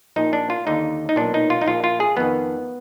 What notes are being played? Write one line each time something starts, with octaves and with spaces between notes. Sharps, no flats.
A#1 A#2 D#4
D4
F4
D#2 D3 D#4
D#4
B1 A#2 D4
D#4
F4
D#4
A#1 A#2 F4
F4
G#4
F2 D#3 B3